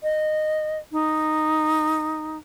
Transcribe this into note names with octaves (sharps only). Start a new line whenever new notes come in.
D#5
D#4